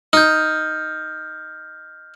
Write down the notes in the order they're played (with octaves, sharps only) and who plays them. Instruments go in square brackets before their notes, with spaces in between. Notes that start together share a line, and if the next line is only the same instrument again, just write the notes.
[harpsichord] D#4 [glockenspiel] F6 G6